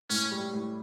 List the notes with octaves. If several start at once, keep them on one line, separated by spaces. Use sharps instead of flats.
A2 C#4
G3
A2